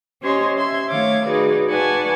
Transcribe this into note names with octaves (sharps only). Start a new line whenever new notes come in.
C#4 G4 C5 C#5 D#5 C6
E5 C6 G#6
D#3 A3 C#5 F5 D6 G#6
D#4 F#4 G#4 B4 D5
B4 D5 F#5 G#5 A5 C#6